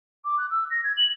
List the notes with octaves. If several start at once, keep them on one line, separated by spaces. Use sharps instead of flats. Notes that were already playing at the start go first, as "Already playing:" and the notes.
D6
F#6
E6
A#6
G#6
F#7